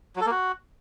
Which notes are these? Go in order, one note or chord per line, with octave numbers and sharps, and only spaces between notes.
F#3
A4
A#3
F#4